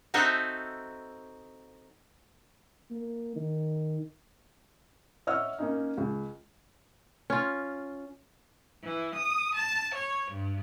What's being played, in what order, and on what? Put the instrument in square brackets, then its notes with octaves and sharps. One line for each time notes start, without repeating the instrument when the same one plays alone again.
[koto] C4 D#4 F#4 A4 E5 F#5
[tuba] A#3
D#3
[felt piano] C#5 D#5 E5 F#5 E6 F6
A#3 C#4 D#4
C#2
[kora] C#4 F4
[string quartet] E3
D#6
A5
C#5
G2